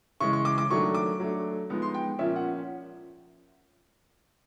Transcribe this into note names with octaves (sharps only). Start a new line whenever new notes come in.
C#3 E3 G#3 C#6
C#6
D6
D6
D#3 F#3 A3 D4 C#6
D6
F#3 A3 D4
F3 G#3 B3 D#4
C6
G5
A#2 F3 A#3 C#4 E5
F#5